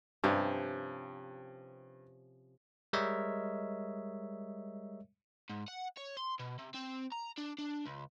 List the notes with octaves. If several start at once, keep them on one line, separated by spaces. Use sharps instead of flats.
G2 C3 F3 C#4
G3 G#3 A#4 C#5 D#5 E5
G#2
F#5
C#5
C6
B2
C3
C4
A#5
D4
D4
C#2